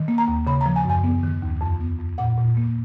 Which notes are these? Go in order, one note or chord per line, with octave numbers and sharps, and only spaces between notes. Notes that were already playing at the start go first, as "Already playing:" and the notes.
Already playing: D#3
A#3
A#5
D#2
C#3 B5
F3 A#5
G#5
F#2
G#5
B3
D#3
D#2
F2
B3
F2
A#2 F#5
A#2
A#3